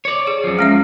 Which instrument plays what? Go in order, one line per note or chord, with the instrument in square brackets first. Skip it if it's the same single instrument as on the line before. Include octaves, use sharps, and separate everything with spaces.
[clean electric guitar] C#5 D5
[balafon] G#4
[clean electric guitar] F#2 F3
[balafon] G#3 C#4 E5